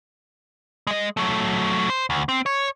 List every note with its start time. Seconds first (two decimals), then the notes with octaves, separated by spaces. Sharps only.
0.87 G#3 D#5
1.17 F#3 A3
1.90 C5
2.10 D2
2.29 C4
2.46 C#5